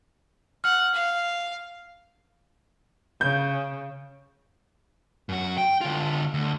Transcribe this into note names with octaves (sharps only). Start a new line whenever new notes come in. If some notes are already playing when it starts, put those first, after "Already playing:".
F#5 F6
F5
C#3 G6
F#2 F#4
G5
D3 F4
D2